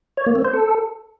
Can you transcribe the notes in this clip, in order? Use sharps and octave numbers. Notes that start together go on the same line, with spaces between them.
C#5
A#3
C4
C5
A4